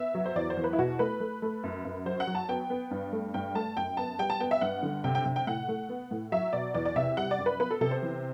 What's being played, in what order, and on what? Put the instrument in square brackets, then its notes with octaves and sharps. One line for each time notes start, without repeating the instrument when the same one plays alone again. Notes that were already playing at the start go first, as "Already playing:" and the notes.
Already playing: [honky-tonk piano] B3 E5
F#3
C5
E2 D5
C5
E2
B4
E4
B2 F#4
A3 B4
A3
A3
F#2
F#2
F#3 C5
F#5
F#3
A5
B3 G5
B3
G2
A3
G2 G5
A3 A5
F#2 G5
B3 A5
G3 G5
A5
B3 G5
E5
G2 F#5
D3
C3 G5
G5
C3
G5
A2 F#5
A3
B3
A2
F#3 E5
B2 D5
E2 D5
D5
C3 E5
G3 F#5
D5
F#2
B4
B3 B4
A4
C3 A4
C5
E3